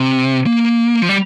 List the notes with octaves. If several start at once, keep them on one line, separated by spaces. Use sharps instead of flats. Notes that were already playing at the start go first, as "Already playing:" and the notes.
Already playing: C3
A#3
F3
G3